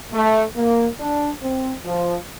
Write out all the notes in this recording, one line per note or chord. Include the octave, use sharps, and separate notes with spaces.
A3
A#3
D4
C4
F3